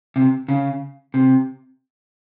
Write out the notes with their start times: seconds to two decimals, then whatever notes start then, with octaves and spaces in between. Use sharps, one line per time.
0.16 C3
0.48 C#3
1.14 C3